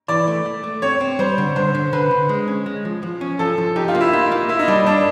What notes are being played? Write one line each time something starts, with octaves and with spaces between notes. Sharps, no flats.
E3 D5
A3
A3
A3
C4 C#5
C4
G3 C5
D3
D3 C5
D3
D3 B4
D3
G#3
C#4
G#3
F3
F3
C#4
F3 A4
F3
D#4 G4
F4
A#3
E4
D#4 F4
A#3
A#3 E4
D#4
G3 D4
A#3 D4